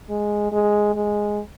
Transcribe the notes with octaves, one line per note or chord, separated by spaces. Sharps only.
G#3
G#3
G#3